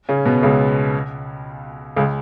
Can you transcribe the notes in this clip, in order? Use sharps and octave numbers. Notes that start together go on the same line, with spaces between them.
C#3 C#4
B2 B3
C#2 C#3
C#2 C#3